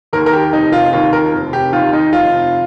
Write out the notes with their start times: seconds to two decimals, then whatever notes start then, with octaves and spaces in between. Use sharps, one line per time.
0.13 D#2 D#3 A#4
0.26 A#4
0.33 G4
0.53 F1 D#4
0.72 F4
0.93 D#2 D#3 F4
1.13 A#4
1.33 F1
1.53 G4
1.73 D#2 D#3 F4
1.93 D#4
2.13 F1 F4